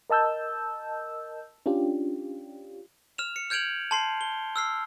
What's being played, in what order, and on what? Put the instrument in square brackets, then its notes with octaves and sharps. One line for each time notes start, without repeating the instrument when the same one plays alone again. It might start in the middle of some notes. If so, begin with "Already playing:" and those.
[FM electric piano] A#4 D#5 A5 E6 G6
C#4 D4 F4 G4
[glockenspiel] F6 E7 F7
C#7
F6 G6 G#6 D7 F7 F#7
A5 C6 C7
G7
E6 F6 C7